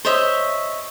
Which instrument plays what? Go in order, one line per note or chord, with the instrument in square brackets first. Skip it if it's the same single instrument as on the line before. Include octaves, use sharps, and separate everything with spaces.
[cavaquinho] C5 C#5 D#5 E5